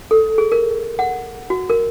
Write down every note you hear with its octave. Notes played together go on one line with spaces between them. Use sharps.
A4
G#4
A#4
F#5
F#4
A#4